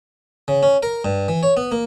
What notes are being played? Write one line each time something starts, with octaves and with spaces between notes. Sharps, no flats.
C#3
C#4
A#4
G2
E3
C#5
B3
A#3